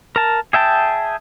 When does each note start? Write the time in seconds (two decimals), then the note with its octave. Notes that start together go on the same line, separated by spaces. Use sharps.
0.16 A#4 A5
0.53 G#4 E5 G5 A5